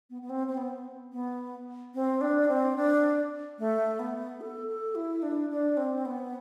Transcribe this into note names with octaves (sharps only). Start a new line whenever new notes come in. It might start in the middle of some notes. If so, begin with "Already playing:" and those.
B3
B3
C4
C4
B3
B3
C4
D4
C4
D4
A3
B3
A4
A4
E4
D4
D4
C4
B3